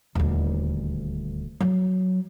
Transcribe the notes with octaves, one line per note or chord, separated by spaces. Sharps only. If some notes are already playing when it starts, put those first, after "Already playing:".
D#1 D2
F#3